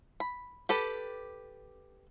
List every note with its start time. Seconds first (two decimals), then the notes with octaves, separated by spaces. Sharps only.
0.20 B5
0.69 G4 A4 B4